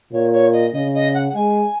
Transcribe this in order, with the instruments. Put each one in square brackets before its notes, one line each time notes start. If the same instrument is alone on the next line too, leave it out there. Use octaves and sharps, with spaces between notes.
[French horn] A#2 [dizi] C#5
[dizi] C#5
D#5
[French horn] C#3 [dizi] D#5
[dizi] D#5
F#5
F#5
[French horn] G#3 [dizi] G#5